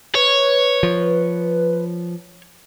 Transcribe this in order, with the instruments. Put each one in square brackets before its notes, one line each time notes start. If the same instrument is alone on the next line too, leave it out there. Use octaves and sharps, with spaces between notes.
[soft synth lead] B4 [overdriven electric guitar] C#5
[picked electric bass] F3